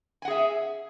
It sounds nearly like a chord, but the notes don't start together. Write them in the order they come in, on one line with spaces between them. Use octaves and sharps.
G#5 F#5 G#4 E5